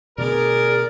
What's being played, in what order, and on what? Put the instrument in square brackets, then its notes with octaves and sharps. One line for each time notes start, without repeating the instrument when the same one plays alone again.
[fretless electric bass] B2 D3 A3 [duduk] G#4 [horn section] A#4 [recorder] D5